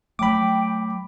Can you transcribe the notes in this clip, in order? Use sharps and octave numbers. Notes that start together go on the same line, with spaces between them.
F#3 A3 G5 B5 D6